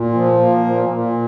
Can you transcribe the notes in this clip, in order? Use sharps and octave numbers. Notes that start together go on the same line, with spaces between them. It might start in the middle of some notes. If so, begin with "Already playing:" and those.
Already playing: A#2
F3
A#3
A#2
A#2